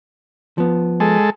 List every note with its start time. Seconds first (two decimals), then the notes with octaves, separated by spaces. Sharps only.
0.58 F3 B3
1.00 G#3 A4